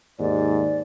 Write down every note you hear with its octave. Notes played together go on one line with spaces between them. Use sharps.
D#2 G#2 D5